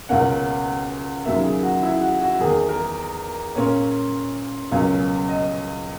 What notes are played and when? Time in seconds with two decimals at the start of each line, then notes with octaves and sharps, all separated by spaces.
0.09 C#2 B2 A#3 C#4 F#5
1.25 D#2 C#3 F#3 A#3 E5
1.44 G#4
1.63 F#4
1.83 E4
2.01 F#4
2.21 F#4
2.40 E2 D#3 A#3 G#4
2.69 A#4
3.55 A#2 A#3 C#4 C#5
4.71 C#2 B2 F#3 A#3 C#4
5.29 D#5